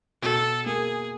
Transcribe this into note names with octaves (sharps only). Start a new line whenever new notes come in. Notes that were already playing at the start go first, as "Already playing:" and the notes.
B2 A4
A#3 G#4